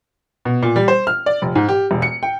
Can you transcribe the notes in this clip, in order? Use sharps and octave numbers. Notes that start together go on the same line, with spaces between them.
B2
A#2
G3
C5
F6
D5
F1
G#2
G4
E1
C#7
G5